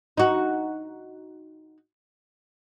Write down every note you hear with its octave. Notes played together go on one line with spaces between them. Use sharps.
D#4 F#4